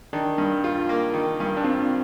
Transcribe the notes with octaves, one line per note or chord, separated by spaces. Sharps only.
D#3 D4
G2
F4
A#3
D#3
G2
D4
C4 F4